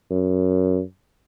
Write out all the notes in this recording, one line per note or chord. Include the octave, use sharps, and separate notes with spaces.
F#2